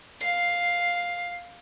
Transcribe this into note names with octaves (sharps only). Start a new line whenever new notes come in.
F5 C7